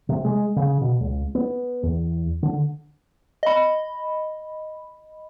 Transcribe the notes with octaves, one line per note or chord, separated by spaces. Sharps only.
C3
G#3
C#3
B2
C#2
B3
E2
D3
D#5 B5